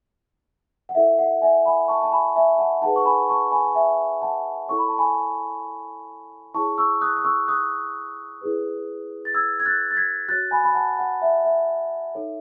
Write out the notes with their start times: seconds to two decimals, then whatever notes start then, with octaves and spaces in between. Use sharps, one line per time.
0.89 F#5
0.95 E4 A4 C#5 E5
1.19 F#5
1.41 E5 G#5
1.65 G#5 B5
1.88 A5 C#6
2.03 A5
2.11 G#5 B5
2.36 E5 G#5
2.58 F#5 A5
2.81 D#4 G#4 B4 F#5 A5
2.96 C#6
3.05 G#5 B5
3.29 A5 C#6
3.51 G#5 B5
3.75 E5 G#5
4.22 F#5 A5
4.68 E4 A4 C#5 C#6
4.78 B5
4.88 A5
4.98 G#5 B5
6.54 E4 G#4 C#5 A5 C#6
6.78 C#6 E6
7.01 D#6 F#6
7.17 D#6
7.24 C#6 E6
7.48 D#6 F#6
8.41 E4 G#4 B4
9.25 A6
9.35 E6 G#6
9.60 G#6
9.66 F#6 A6
9.91 A6
9.97 G#6 B6
10.29 F#4 C#5 F#6 A6
10.51 G#5 B5
10.64 B5
10.74 F#5 A5
10.99 F#5
11.22 E5
11.45 E5
12.15 D#4 A4 C#5